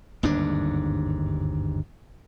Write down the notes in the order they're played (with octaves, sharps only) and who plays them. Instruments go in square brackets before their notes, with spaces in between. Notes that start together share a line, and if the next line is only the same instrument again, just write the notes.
[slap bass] G1 D#2 G#2 D4